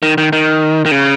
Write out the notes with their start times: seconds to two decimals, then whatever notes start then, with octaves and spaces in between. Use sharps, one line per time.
0.03 D#3
0.18 D#3
0.33 D#3
0.86 D#3
0.91 C#3